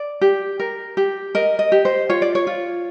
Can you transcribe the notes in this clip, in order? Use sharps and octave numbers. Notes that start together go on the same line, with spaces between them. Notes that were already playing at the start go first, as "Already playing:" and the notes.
Already playing: D5
G4
A#4
G4
A#4 D#5
D#5
G4
C5
F4 C#5
D5
C#5
F4